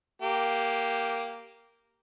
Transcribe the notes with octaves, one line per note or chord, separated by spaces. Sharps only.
A#3 G4